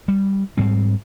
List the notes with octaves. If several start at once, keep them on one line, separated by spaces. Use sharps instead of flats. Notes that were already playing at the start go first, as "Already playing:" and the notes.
G3
G#2 G3 C4